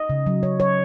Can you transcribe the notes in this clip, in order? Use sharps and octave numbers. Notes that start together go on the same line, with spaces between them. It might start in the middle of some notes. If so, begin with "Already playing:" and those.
Already playing: D#5
C#3
F#3
C#3 C#5
F#3 C#5